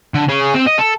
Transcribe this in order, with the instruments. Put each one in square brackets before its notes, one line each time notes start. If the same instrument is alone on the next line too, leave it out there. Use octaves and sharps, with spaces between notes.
[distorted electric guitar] D3
G#4 C#5
C4
D#5
A4